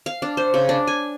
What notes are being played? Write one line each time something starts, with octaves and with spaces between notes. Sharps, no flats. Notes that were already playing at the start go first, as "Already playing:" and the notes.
F5
D4
C5
C#3
D4
G#5